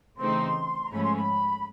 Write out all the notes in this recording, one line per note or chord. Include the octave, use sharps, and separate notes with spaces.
C#3 E3 A3 C4 D#4 C6
A#5
G#2 F3 A3 C#4 B5
C6
B5